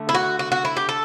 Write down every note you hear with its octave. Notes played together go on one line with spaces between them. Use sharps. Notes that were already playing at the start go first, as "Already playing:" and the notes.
Already playing: D3 A3
E4
F#4
F#4
F#4
E4
G4
A4